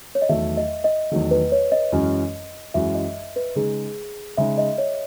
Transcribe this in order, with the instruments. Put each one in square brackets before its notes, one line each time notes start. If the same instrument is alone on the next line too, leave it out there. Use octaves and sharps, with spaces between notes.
[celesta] C#5
D#5
[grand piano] E2 D#3 F#3 A3 [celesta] E5
[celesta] D#5
D#5
[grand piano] E2 D#3 F#3 A3
[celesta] B4
C#5
D#5
[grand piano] F#2 E3 G#3 C#4 F#4
[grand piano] F#2 E3 G#3 C#4 F#4 [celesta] E5
[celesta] D#5
B4
[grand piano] C#3 G#3 D#4 [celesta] G#4
[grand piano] C#3 G#3 D#4 [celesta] E5
[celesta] D#5
C#5